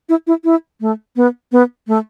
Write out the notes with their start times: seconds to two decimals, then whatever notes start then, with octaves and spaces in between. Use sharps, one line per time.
0.09 E4
0.27 E4
0.44 E4
0.81 A3
1.16 B3
1.52 B3
1.87 A3